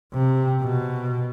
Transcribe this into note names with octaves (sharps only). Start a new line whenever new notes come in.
C3
B2